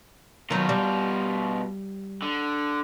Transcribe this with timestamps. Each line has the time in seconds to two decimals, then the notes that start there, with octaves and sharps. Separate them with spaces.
0.51 B2 D#3 F#3 F4
0.69 G3
2.22 D3